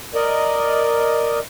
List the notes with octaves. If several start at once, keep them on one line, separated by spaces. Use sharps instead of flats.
A#4 D5 D#5